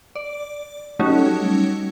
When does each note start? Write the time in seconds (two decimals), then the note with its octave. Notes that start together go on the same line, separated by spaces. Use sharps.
0.15 D5
0.99 F#3 G3 A3 C#4 D#4 F#4